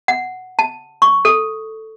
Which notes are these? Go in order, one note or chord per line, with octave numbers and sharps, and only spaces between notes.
F#5
A5
C#6
A4